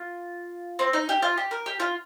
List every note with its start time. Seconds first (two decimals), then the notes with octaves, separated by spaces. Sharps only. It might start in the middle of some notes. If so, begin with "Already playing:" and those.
Already playing: F4
0.79 C4
0.93 D#4
1.09 G4
1.22 F4
1.37 G4
1.51 A#4
1.66 G4
1.80 F4